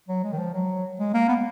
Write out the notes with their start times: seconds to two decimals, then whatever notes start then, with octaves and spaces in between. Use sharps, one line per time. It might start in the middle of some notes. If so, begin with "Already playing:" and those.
0.08 F#3
0.23 G#3
0.32 D#3
0.38 F3
0.53 F#3
0.99 G#3
1.14 A#3
1.29 B3